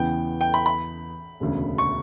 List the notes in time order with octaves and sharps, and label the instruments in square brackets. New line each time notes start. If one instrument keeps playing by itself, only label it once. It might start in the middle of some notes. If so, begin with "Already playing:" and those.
Already playing: [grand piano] E2 C#3 E3 B3 [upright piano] G5
[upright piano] G5
B5
B5
[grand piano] E1 D2 C#3
[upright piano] C#6